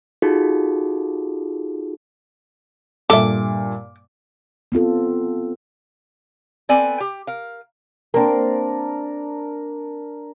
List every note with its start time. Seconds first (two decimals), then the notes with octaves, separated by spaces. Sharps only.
0.22 D#4 F4 F#4 G#4 A4
3.10 G2 A#2 A4 E5 D6
4.72 B3 C4 F4 A4
6.69 B3 C4 A4 D5 G#5
7.00 G4
7.27 A#4 F5
8.14 A#3 C4 D4 A#4